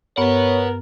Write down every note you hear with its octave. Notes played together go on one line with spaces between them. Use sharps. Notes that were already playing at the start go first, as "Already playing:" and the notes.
G2 B3 A#4 B4 C#5 F#5